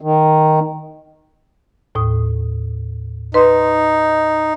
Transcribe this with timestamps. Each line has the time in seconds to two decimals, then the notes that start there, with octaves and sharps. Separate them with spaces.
0.01 D#3
1.95 D#2 A2 D#6
3.34 D#4 B4 C6